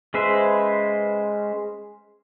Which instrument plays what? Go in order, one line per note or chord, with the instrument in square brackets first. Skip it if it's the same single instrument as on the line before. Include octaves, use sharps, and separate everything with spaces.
[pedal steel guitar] G#3 C#4 B4 C5 E5